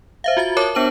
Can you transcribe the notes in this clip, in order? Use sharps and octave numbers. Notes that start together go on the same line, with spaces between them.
C5 E5 F5
F4 F#4 E5 A6
A#4 C#5 A5 D6
B3 D4 C5 A5 F#7